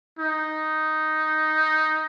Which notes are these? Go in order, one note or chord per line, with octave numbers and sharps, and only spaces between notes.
D#4